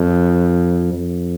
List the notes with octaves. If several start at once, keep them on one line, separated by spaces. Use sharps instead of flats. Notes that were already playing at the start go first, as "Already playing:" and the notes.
Already playing: F2
F2